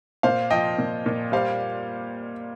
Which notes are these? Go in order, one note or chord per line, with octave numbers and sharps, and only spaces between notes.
A#2 C5 F5
F3 D#5 G5
A#2
A#2
G3 C5 F5